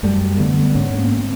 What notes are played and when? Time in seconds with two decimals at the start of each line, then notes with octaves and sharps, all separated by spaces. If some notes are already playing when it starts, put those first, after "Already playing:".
0.03 F#2 G3 A3
0.39 D3 A3 B3
0.75 G#2 B3 C#4
0.98 A#3 C4